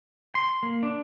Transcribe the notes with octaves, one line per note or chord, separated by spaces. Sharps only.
C6
A#3
D4